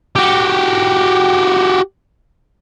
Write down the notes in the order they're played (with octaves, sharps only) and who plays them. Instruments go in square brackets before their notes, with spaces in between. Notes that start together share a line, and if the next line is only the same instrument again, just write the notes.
[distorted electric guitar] F#4 G4